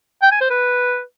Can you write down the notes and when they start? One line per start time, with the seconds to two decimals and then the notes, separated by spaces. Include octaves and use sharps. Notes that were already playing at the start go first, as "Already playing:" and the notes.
0.22 G5
0.32 G#5
0.41 C5
0.50 B4